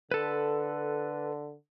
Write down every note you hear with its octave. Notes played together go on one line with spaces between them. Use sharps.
D3 A4 B4